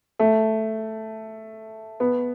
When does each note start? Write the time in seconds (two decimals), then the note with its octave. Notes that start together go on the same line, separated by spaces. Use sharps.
0.19 A3
2.00 B3